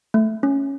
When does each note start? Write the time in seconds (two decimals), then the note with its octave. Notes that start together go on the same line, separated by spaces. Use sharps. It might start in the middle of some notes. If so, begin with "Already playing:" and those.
0.14 A3
0.43 C#4